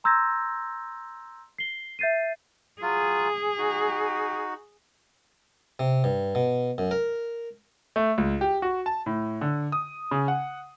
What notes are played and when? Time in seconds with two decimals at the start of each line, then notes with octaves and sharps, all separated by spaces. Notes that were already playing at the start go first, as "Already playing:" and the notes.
0.04 A#5 C6 E6 G6 G#6 A#6
1.58 C7 G7
1.99 E5 G6 A6 C7 D#7
2.82 F#3 F4 G#4
3.58 D#4 F#4
5.79 C3
6.04 G2
6.35 B2
6.78 F#2
6.91 A#4
7.96 A3
8.18 C#2
8.41 G4
8.62 F#4
8.86 A5
9.06 A2
9.41 D3
9.72 D#6
10.11 C#3
10.28 F#5